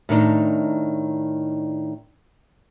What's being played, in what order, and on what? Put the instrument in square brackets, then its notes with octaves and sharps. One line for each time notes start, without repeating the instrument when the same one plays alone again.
[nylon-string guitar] A2 D#3 D4 D#4